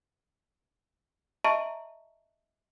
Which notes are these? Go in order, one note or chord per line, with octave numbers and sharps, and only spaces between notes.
D#5 E5 A5 A#5 C#6